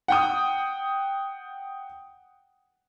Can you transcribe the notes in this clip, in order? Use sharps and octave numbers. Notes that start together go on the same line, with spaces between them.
F#5 G5 D#6